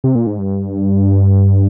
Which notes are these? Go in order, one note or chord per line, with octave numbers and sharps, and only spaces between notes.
C3
A#2
G#2
G2